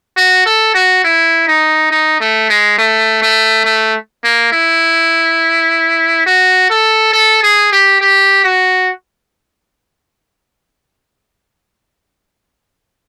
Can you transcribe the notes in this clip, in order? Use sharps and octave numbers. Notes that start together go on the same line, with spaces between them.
F#4
A4
F#4
E4
D#4
D#4
A3
G#3
A3
A3
A3
A#3
E4
F#4
A4
A4
G#4
G4
G4
F#4